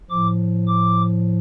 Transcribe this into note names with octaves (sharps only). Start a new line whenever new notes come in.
A2 F3 D6
D6